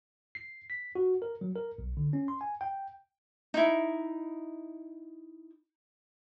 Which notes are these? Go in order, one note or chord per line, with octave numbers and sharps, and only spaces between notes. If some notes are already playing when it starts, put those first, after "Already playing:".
C7
B6
F#4
A#4
F#3
A#4
B1
D3
C#4
C6
G#5
G5
D#4 E4